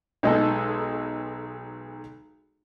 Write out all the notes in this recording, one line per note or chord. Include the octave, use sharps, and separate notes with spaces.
B1 G#3 D#4 G#4 A4